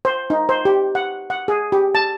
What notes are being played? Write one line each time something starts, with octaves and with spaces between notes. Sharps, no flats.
C5
D#4
C5
G4
F#5
F#5
G#4
G4
A5